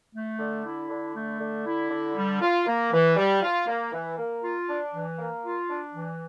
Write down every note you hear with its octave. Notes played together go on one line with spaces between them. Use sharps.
A3
D3
E4
D3
A3
D3
E4
D3
G3
F4
A#3
E3
G3
F4
A#3
E3
A#3
F4
D4
E3
A#3
F4
D4
E3